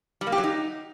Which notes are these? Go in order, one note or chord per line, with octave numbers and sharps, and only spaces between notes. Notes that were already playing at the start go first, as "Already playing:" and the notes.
G3
A#3
G4
F#3
D#4